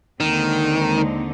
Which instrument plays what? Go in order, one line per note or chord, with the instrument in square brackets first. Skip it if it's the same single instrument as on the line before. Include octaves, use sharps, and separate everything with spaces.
[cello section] D#2 D3 G#3 C4 D#4 [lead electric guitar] D#3